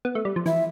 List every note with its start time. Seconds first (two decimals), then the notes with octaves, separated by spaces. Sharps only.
0.05 B3
0.15 A3
0.25 G3
0.36 F3
0.46 E3 E5